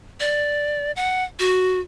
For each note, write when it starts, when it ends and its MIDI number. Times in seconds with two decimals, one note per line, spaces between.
0.20 0.92 74
0.96 1.24 78
1.39 1.80 66